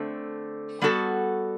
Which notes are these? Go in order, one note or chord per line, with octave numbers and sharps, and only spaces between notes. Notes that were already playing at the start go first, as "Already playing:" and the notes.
Already playing: D3 A3 C4
G3 B3 F#4 A4